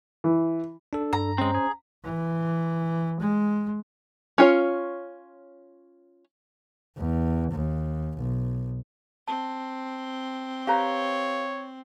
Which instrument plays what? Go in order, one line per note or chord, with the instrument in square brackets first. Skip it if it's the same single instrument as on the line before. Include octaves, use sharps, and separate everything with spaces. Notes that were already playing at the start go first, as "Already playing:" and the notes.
[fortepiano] E3
[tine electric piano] D4 A4
[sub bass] G2 [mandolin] A#5
[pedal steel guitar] G#3 C4 [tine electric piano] C#4 C5
[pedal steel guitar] G#4
[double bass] E3
G#3
[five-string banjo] C#4 F4 C#5
[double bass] E2
D#2
B1
[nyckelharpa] C4 [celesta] A5
[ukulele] G4 B4 A#5 [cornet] C#5 [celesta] F5